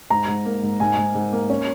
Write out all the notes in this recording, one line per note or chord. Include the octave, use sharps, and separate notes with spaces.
G#2 A#5
G#2
A#3
G#2
G#2 G#5
G#2
G#2
A#3
C#4 C#5